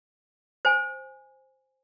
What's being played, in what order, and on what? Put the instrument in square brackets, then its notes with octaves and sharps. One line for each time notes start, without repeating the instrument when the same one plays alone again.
[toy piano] C5 G#5